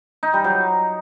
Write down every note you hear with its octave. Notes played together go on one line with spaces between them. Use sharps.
D#4
G3
F#3